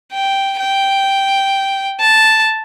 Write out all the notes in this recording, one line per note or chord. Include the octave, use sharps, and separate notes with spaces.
G5
G5
A5